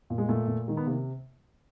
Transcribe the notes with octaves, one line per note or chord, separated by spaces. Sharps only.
A#2
G#3
A#2 A3
A#2
D#3 G#3
B3
C3 A#3